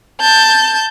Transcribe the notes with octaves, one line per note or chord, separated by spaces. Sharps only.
A5 G6